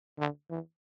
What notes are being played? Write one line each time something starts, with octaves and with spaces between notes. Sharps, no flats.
D3
E3